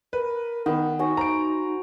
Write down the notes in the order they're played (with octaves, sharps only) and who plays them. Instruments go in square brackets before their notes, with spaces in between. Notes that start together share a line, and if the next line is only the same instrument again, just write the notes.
[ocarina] A#4 [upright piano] B4
[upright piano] D#3 [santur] B3
[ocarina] D#4 [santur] F#4 F#5 G#5
[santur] C5 [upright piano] A#5 D7